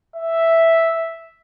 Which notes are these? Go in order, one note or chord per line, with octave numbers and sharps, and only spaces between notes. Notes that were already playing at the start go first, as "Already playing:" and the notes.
E5